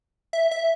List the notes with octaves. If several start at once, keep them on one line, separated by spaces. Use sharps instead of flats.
E5
E5